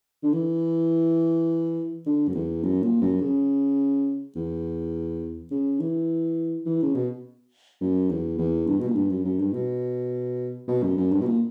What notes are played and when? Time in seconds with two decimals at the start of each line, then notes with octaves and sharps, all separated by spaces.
0.23 D3
0.33 E3
2.06 D3
2.28 F#2
2.34 E2
2.63 F#2
2.82 A#2
3.02 F#2
3.21 C#3
4.36 E2
5.51 C#3
5.80 E3
6.66 E3
6.83 C#3
6.95 B2
7.81 F#2
8.10 E2
8.38 E2
8.67 G2
8.81 B2
8.88 A#2
8.95 G2
9.10 F#2
9.24 F#2
9.39 G2
9.53 B2
10.68 B2
10.82 F#2
10.97 F#2
11.11 G2
11.21 B2
11.26 A#2